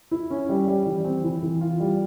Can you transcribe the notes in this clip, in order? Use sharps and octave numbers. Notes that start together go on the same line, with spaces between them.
E4
C#4
G3
G3
E3
C4
E3
E3
F4
G3